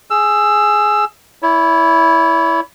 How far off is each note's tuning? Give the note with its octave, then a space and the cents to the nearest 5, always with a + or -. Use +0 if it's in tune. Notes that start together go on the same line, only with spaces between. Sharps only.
G#4 +5 E6 +20
E4 +0 C#5 +40